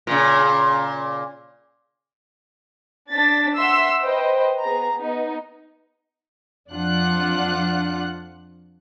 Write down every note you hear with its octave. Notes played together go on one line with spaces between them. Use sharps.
A#2 C#3
D4 A6 B6
E5 F#5 C6 E6 B6
B4 C5 D#5 G5
B3 G#4 A#5
B3 D#4
F2 F3 D4 F4 F#5 F#6